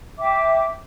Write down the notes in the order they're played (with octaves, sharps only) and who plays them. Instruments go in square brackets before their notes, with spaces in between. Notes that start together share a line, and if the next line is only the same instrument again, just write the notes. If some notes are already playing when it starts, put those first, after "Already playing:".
[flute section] E5 G5 D6